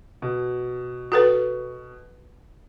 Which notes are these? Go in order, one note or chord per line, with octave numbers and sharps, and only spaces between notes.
B2
F#4 A4 B4